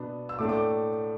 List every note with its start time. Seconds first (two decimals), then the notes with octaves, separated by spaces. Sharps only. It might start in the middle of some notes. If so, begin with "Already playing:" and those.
Already playing: B2 B3 D4
0.29 E6
0.39 A2 A3 D4 D6
0.49 D6